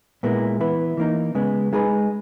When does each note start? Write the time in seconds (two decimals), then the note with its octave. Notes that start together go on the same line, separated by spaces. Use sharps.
0.23 A#2 G#3 B3 E4 A#4
0.60 E3 B3 E4 B4
0.97 E3 A#3 D#4
1.35 C#3 G#3 B3
1.73 G#3 D#4 G#4 B4